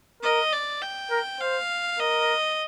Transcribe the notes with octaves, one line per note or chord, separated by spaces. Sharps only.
A#4 D#5
D5
G5
A#4
C5 F5
A#4 D#5